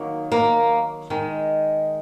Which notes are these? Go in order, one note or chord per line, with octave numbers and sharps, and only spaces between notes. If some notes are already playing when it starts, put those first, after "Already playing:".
Already playing: D#3 F#3 A#3
A#3
D#3 G#3